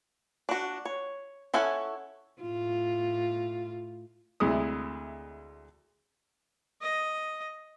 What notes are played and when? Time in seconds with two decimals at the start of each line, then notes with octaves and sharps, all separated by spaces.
0.49 D4 F#4
0.85 C#5
1.54 C#4 E4 A4 F#5 G#5
2.42 A2 F4
4.40 D2 C3 G#3 E4 D#6
6.82 D#5